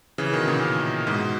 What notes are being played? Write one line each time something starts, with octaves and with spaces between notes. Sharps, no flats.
C#3 E3
B2 D#3
A#2 C#3
G#2 B2